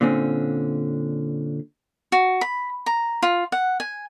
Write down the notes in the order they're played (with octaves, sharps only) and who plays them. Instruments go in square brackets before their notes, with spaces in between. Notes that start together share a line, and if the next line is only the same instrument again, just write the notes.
[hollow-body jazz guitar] A#2 D3 C4 C#4
[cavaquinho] F#4
B5
A#5
F4
F#5
G#5